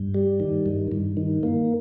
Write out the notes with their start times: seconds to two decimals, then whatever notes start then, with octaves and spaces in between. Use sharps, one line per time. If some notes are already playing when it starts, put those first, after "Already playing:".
Already playing: G2
0.14 G3
0.40 D#3
0.66 G2
0.92 G2
1.17 D#3
1.43 A#3